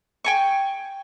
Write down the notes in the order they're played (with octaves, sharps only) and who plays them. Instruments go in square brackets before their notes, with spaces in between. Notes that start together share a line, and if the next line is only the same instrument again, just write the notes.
[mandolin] G5 G#5 C#6